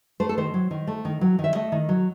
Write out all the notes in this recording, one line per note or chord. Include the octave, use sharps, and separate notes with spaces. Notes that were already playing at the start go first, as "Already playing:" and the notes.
A3 C5
A4
D#3 C5
F#3
D#3
A3
D#3
F#3
D#3
E5
A3 D#5
D#3
F#3